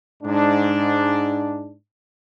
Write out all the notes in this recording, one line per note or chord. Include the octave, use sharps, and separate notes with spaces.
G#2 D4